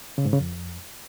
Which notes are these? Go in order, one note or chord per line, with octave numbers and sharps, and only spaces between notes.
C#3
G#2
C#3
F2